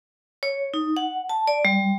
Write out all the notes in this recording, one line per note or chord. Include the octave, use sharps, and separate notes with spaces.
C#5
D#4
F#5
A5
D5
G3